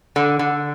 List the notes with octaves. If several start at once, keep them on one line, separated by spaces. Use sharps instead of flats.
D3
D3